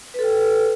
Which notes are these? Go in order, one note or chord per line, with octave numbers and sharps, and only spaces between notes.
A4 B4 G5